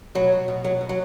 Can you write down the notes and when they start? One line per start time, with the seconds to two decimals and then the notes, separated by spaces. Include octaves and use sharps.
0.15 B2 F#3
0.32 B2
0.48 B2
0.64 B2 F#3
0.81 B2
0.89 F#3